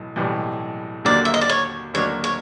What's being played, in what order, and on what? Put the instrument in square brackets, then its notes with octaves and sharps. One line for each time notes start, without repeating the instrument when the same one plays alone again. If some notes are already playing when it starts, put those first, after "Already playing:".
Already playing: [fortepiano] B1 A2 E3
B1 A2 E3 G3
[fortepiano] D#2 D3 F#3 A#3 D4 [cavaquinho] D5
[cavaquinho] E5
D#5
D5
C#5
[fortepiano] D#2 D3 F#3 A#3 D4 [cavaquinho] C#5
[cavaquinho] C#5